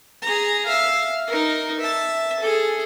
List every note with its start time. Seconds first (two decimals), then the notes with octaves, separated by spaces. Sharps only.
0.22 G#4 A#5
0.66 E5 F5
1.27 D#4 A#4
1.80 E5 A5
2.40 G#4 A4